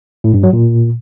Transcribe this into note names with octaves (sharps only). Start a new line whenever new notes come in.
A2
G2
F#3
A#2